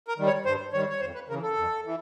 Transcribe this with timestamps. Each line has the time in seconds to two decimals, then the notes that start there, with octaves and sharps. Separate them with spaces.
0.08 A#4
0.18 D#3 G3
0.27 C#5
0.45 G2 C5
0.73 D#3 G3 C#5
0.89 C#5
1.01 F2 C5
1.15 B4
1.29 C#3 E3 A#4
1.43 A4
1.57 F2
1.86 E3